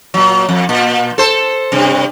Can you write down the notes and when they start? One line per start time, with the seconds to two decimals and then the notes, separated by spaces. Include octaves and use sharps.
0.14 A#2 F#3
0.49 F2
0.69 A#2
1.18 A4 C5
1.72 G2 C3